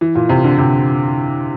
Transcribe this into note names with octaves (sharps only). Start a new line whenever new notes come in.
E3
A#2
C3
D3
C3